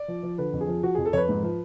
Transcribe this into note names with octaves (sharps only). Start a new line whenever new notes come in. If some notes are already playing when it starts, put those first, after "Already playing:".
Already playing: D5
F3
F3
D3 B4
F2
G#4
F3
F3 F#4
F2 G#4
A4
F2 B4 C#5
G#2
F3